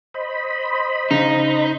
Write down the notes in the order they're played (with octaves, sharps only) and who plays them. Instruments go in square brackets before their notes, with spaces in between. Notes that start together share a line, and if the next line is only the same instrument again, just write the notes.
[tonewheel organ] C5 D#5 B5
[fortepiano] C#3 [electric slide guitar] D#4